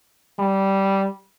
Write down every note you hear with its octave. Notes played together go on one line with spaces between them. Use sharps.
G3